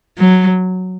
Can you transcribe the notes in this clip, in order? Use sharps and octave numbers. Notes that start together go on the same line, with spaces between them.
F#3